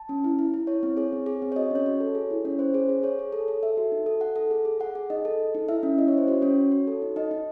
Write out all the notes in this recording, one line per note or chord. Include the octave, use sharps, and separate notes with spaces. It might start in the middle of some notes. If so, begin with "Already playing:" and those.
Already playing: A5
C#4
E4
E4
E4
E4 C#5
C4
G#4 C#5
C4
G#4
C4
C#5
F#4 D#5
C#4 C#5
F#4
A4
G#4
E4
C#4 C#5
C#4 C5
G#4 C5
G#4
G#4 C#5
G#4
A4
A4
A4 E5
F#4
D#4
A4
A4 F#5
A4
G#4
G#4
G#4 F#5
G#4
D#4 D#5
A4
A4
D#4
E4 E5
C#4
E4 D#5
C#5
C#4
C5
F#4 C#5
C#4 C#5
F#4
F#4
A4
D#4
D#4 D#5
D#4